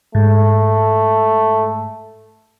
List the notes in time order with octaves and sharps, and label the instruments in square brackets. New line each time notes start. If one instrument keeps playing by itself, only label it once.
[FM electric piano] G#2 [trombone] A3